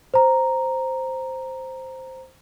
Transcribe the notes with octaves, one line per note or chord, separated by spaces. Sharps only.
C5 A#5